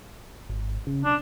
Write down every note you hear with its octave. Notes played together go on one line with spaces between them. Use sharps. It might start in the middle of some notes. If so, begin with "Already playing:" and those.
G#1
C#3
B1 D4